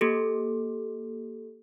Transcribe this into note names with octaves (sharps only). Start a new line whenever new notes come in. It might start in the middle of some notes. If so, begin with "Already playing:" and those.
A#3 G4 A4